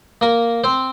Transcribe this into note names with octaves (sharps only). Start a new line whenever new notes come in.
A#3 A#4
C4 C5